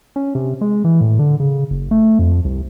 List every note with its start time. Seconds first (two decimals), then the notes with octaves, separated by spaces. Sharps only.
0.16 C#4
0.35 C3
0.61 G#3
0.84 E3
1.01 A2
1.19 D3
1.40 C#3
1.71 F#1
1.91 A3
2.19 F2
2.45 C2